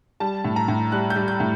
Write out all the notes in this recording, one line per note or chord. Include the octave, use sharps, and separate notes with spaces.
G3 A5
A2
A#5
A2
G3 F#6
G6
G3
G6
A2